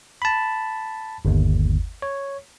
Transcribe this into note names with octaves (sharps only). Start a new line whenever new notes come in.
A5 B5
G1 D#2
C#5